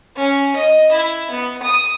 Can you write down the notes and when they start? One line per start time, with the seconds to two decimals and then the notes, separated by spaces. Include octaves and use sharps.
0.16 C#4
0.56 D#5
0.92 E4
1.31 B3
1.63 D#6